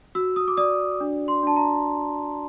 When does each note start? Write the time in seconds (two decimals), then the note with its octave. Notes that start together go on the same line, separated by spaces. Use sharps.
0.15 F#4 E6
0.36 D#6
0.48 D6
0.57 D5 D#6
1.00 D4
1.28 C6
1.43 D4 A5
1.56 A#5